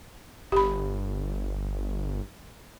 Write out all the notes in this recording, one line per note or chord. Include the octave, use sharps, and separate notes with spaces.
G1 G4 B5